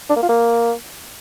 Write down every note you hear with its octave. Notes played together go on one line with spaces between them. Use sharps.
D4
A#3
F4
A#3